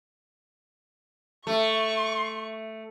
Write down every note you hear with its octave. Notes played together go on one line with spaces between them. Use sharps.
A3 C#6